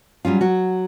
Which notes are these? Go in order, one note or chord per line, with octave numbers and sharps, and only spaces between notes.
F#3 G3 C#4 F4
F#3 F#4